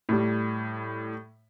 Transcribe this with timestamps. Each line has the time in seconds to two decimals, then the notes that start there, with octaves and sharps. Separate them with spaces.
0.09 A2 G3